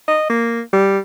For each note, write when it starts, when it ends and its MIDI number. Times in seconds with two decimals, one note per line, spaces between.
0.08 0.24 75
0.29 0.61 58
0.73 0.98 55